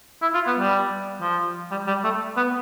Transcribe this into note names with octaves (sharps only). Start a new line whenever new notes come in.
E4
F4
B3
G3
F3
G3
G3
A3
B3